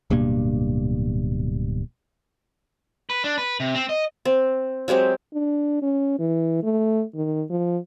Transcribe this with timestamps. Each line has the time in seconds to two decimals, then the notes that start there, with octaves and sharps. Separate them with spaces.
0.10 D1 G2 B2 A#3
3.10 B4
3.24 D4
3.38 B4
3.60 C3
3.75 C4
3.89 D#5
4.25 C4
4.88 F#3 G#3 C4 G4
5.33 D4
5.82 C#4
6.19 E3
6.63 A3
7.15 D#3
7.50 F3